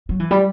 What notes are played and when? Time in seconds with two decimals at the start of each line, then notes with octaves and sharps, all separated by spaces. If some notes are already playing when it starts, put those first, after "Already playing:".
0.09 F#3
0.20 E3
0.31 G3